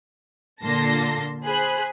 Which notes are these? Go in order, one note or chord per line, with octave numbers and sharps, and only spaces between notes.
A#2 D3 A#3 A5 C6 A#6
G#4 C5 B5 F#6